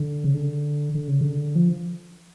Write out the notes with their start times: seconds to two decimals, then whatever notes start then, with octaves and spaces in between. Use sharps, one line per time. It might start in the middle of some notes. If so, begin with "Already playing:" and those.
Already playing: D3
0.24 C#3
0.34 D3
0.95 D3
1.08 C#3
1.21 D3
1.55 F3